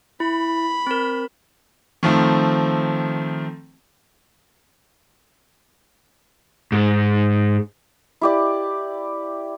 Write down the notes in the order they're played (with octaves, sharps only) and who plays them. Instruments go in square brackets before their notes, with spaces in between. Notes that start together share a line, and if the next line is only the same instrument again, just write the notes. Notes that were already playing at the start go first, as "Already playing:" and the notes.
[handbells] E4 [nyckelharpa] B5
[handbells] C4 A#4
[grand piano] D#3 F3 A3 C4
[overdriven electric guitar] G#2
[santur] E4 G4 D5